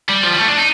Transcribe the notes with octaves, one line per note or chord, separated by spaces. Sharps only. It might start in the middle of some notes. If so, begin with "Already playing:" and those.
G3
F3
G3
A3
D4
D#4